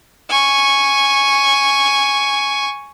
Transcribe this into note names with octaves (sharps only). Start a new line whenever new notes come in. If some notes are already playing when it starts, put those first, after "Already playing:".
G#5 C#6